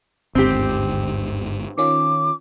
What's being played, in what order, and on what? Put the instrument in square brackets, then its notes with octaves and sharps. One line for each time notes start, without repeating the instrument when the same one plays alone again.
[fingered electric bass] G1 G#2 [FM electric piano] D#2 D3 [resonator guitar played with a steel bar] C4 G4
[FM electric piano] D#3 C#4 F4 [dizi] D6